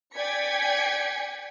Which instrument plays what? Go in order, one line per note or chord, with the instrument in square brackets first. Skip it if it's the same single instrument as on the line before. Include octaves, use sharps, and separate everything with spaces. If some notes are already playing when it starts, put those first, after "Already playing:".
[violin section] D5 G5 G#5 G#6 B6 C#7